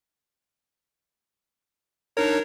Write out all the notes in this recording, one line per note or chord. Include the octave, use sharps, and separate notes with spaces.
D4 D#4 A#4 C#5